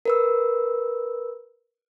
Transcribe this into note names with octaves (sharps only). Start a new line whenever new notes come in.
A#4 B4 E6